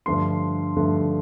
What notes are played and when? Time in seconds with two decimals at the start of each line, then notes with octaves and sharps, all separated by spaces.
0.06 G2 D3 F3 A3 C6
0.76 G2 D3 F3 A3